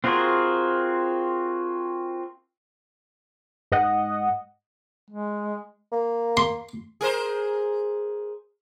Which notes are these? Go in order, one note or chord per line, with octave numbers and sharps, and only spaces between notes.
C4 F4 F#4 G#4 A#4
G#2 D#5 F#5
G#3
A#3
C6
G#4 A#4 C5